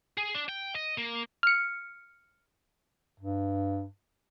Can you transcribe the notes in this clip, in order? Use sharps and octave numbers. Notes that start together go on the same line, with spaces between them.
G#4
D4
G5
D#5
A#3
F6 C#7
G2